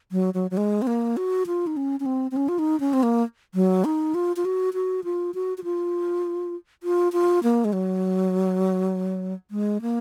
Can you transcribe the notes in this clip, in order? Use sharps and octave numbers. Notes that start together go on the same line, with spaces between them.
F#3
F#3
F#3
G#3
C4
A#3
F#4
F4
D#4
C#4
C#4
C4
C4
C#4
F4
D#4
C#4
C4
A#3
F#3
D#4
F4
F4
F#4
F#4
F4
F#4
F#4
F4
F4
F4
A#3
G#3
F#3
G#3
A#3